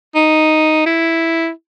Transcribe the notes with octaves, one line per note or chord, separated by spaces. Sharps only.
D#4
E4